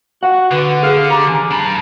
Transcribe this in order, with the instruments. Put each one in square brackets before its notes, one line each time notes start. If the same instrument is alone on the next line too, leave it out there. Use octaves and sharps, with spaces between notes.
[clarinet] F#4 [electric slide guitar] F#5
[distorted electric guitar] D3 [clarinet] B4
[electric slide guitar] G#4 [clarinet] F5
[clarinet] G4 [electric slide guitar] A#5
[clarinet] G#5
[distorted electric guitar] D4 B5 [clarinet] A5